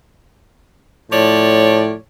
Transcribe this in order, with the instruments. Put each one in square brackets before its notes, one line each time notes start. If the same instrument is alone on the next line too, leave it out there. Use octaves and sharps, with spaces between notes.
[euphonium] A2 [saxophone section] F3 C#5 D5